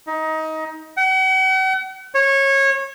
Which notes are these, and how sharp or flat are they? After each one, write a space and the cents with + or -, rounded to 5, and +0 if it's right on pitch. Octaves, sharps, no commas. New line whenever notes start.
D#4 +20
F#5 +40
C#5 -20